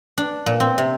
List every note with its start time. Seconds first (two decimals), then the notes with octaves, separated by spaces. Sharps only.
0.18 D4
0.46 A#2
0.60 C4
0.78 C3